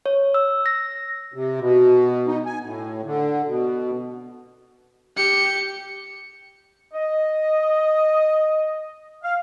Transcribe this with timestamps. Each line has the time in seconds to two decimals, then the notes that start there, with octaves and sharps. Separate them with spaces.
0.06 C#5
0.34 E6
0.66 A#6
1.34 C3
1.60 B2
2.27 D#4
2.46 G#5
2.63 A2
3.05 D3
3.47 B2
5.17 G4 C#7
6.93 D#5
9.23 F5